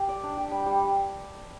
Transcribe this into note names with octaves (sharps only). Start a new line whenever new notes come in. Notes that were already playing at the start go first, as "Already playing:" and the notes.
Already playing: G4 A#4
D5
D4
G4
G3
G3